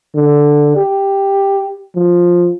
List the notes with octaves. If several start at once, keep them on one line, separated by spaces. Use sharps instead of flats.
D3
G4
F3